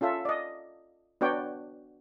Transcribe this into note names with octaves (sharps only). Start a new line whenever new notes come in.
C#4 F4 A4 E5
D5 D#5
B3 D4 F#4 C#5 D5 G5